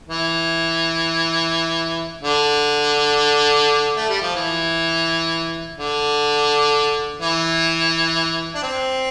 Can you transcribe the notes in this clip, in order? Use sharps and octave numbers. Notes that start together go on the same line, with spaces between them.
E3
D3
A3
G3
F3
E3
D3
E3
D4
C4